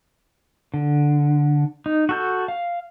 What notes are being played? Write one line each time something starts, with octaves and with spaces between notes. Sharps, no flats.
D3
D#4
F#4 A4 G6
F5